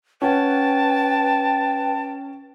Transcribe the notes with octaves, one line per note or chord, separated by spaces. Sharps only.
C#4 B4 F#5 G5 A5